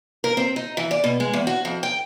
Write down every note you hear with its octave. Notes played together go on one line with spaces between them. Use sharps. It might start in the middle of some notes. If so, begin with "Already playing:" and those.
A#4
C4
D#4
E3
D5
B2
G#3
E2
F#4
F2
G5